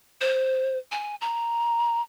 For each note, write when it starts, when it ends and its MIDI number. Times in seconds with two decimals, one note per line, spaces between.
0.21 0.78 72
0.91 1.15 80
1.21 2.02 82